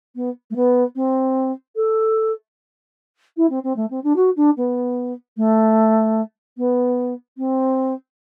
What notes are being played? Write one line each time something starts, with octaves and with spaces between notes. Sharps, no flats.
B3
A3
B3
C4
A4
E4
C4
C4
A3
C4
D4
F#4
D4
B3
A3
B3
C4